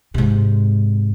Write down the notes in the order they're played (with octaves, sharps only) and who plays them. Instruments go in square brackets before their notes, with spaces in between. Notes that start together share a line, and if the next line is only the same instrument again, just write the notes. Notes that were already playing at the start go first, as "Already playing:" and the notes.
[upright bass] G#2 C3